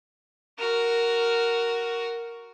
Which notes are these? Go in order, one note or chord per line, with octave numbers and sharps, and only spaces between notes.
F#4 A#4